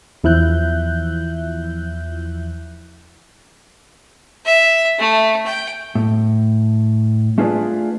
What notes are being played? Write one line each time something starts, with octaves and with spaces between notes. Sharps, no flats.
E2 F3 E4 E5 F#6 G6
E5
A3
G5
A2
A3 D4 F4 G#4 B4 D5